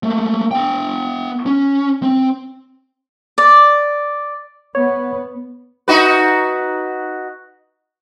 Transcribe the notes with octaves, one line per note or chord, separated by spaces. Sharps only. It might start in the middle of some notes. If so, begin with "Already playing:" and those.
A3 A#3
B3 G5
C#4
C4
D5
B3 C#5
D#4 F#4 B4